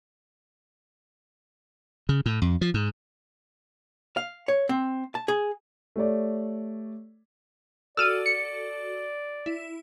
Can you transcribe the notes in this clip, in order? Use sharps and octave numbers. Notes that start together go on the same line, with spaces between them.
C#3
A2
F2
F3
G#2
F5
C#5
C4
A5
G#4
A3 G4 C#5 D5
F#4 A4 D5 E6 F6 D#7
C#7
E4